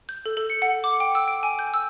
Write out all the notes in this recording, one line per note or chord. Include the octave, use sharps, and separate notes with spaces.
G6
A4
A4
C#7
F#5
D6
G5
E6
D7
G#5
G6
E6